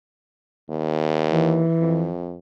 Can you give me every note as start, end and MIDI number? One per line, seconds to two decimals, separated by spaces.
0.69 1.65 39
1.32 2.09 52
1.80 2.37 41